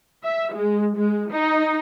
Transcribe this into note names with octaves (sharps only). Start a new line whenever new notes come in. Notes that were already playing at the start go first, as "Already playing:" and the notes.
E5
G#3
G#3
D#4